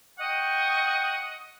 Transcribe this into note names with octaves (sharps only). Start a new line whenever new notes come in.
D#5 F#5 G5 C#6